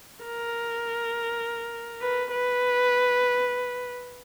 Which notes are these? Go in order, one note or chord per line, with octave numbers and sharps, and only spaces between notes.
A#4
B4
B4